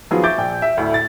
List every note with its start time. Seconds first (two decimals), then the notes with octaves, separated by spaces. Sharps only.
0.11 D#3 F3 F#3 B3 F4 G#4
0.23 E5 C#6 D6 G6 A6 D7
0.38 A#1 G5
0.62 E5
0.77 D2 A2 A3
0.94 A6